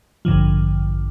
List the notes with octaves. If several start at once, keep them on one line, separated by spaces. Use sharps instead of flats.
A1 G2 D3 F3